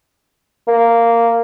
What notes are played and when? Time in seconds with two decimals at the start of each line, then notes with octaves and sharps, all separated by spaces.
0.68 A#3